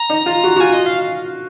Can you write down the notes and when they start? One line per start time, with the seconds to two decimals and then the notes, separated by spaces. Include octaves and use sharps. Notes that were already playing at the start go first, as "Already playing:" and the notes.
Already playing: A#5
0.10 D#4
0.26 F4
0.44 F#4
0.56 F#4
0.60 F4 G#5
0.73 D#5
0.86 F5